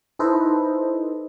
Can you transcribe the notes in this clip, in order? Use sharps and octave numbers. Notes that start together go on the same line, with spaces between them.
D#4 E4 A4 B4 C5 D#5